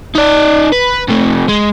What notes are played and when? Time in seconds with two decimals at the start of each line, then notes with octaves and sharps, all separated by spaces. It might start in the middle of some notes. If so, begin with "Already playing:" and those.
0.15 D#4 D5
0.72 B4
1.08 C3 A3
1.48 G#3